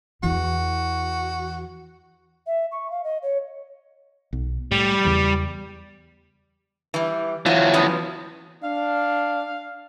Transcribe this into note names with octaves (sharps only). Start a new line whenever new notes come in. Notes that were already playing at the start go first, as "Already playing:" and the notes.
E2 E3 F#4
E5
C#6
F5
D#5
C#5
B1
A2 G3
E2 C#3 E3
E3 G3
E3 F#3 F4
F3 B3 C#4
D4 F5